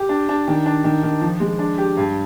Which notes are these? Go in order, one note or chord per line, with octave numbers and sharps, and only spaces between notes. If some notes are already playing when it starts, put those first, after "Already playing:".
Already playing: G4
D4
D4
D#3
D4
D#3
D#3
F3
G#3
D4
G4
G2